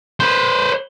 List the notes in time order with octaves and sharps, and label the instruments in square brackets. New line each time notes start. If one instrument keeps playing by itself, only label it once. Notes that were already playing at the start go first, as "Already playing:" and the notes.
[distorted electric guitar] B4 C5